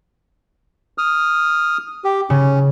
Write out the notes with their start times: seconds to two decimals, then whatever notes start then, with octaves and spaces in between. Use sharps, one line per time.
0.98 D#6 F6
2.04 G4
2.30 C#3 C#4